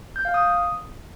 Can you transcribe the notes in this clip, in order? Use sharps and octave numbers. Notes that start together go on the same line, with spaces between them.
G6
F5
D#6